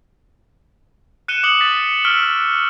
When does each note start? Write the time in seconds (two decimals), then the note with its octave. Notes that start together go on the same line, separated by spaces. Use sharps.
1.28 F#6 C#7 D#7 E7 G7
1.43 D6 D#6 C#7 F#7 G7
1.61 D6 A6 B6
2.05 C#6 E6 F6 B6 D7 G7